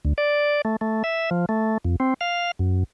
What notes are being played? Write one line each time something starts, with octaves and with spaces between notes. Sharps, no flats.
D2
D5
A3
A3
E5
F3
A3
F2
C4
F5
F#2